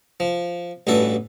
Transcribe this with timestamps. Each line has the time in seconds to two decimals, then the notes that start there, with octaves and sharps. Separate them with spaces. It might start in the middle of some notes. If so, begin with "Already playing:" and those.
0.20 F3
0.87 A1 G2 E3 F#4 A4